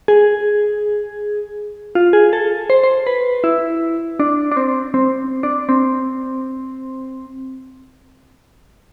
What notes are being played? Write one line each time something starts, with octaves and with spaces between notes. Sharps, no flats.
G#4
F4
G#4
A4
C5
C5
B4
E4
D4
D4
C4
C4
D4
C4